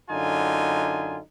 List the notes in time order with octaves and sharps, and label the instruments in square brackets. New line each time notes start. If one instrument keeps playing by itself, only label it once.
[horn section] F#2 D3 D#4 F4 G#5